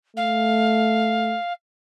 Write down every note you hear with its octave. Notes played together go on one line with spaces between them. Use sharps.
A3 F5